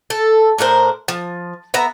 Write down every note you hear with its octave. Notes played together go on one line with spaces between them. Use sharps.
A4
A2 D4 A#4 C5
F3
B3 E5 A#5